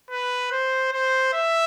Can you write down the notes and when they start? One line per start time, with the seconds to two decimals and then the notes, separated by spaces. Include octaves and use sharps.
0.10 B4
0.52 C5
0.92 C5
1.34 E5